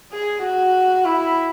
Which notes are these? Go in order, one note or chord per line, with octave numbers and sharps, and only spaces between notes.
G#4
F#4
E4